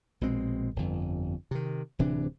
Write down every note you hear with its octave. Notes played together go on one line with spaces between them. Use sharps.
A#1 B2 G#3 C4
G1 F2
C3 D#3
D1 C3 E3 D4